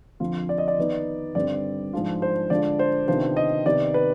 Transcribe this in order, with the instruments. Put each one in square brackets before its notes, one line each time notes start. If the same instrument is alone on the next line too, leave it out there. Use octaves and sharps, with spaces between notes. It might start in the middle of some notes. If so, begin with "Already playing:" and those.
[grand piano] F2 D3 F3 C4 F4
D5
D#5
D5
D#3 B3 D#4
G2 D3 G3 C4 D5
G#2 F3 G#3 D4 F4
C5
D3 G#3 D4 F4 D5
C5
C3 D#3 B3 D4 F4 C5
D#5
C3 D#3 B3 D#4 D5
B4